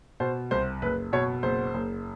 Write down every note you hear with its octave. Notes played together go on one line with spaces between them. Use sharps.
B2 C5
C2 C5
F#1 B4
B2 C#5
F#1 C5
F#1